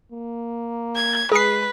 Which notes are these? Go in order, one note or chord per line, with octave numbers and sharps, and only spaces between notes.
A#3
G#6
G#3 G#4 B4 C7